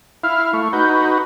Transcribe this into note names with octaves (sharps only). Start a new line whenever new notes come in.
E4 F5 F6
A3 C#6
D#4 F#4 B4 G6